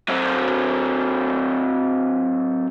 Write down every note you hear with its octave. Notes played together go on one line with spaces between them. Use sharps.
F#3 C4